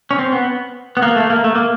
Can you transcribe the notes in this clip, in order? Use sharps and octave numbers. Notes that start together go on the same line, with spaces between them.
C#4
C4
B3
B3
A#3
A3
A#3
A3
A#3